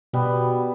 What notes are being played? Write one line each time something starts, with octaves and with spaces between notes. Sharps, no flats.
B2 G3 B3